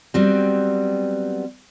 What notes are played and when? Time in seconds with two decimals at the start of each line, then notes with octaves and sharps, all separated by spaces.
0.14 F#3 G3 B3 C4